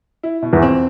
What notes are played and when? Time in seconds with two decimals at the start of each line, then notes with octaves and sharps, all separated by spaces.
0.23 E4
0.42 B2
0.53 E2 E3
0.62 C4